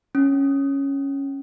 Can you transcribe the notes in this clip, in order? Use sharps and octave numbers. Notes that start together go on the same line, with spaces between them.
C#4